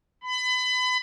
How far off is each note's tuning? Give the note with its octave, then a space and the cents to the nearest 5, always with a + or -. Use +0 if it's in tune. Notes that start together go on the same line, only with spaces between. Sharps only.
B5 +30